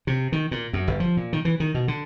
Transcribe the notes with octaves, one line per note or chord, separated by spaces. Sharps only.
C3
D#3
A#2
F#2
G1
F3
A#2
D#3
E3
D#3
B2
D3